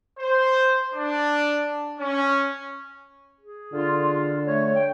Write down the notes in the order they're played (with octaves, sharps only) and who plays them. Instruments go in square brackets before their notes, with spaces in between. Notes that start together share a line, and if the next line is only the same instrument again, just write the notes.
[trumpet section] C5
D4
C#4
[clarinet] G#4
[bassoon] D3 [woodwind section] F4
[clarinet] A3 [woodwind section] C#5
[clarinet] G5